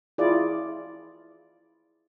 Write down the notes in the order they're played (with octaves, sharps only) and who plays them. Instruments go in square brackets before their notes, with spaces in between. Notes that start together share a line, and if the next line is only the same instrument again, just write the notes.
[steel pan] E4 F4 G#4 D5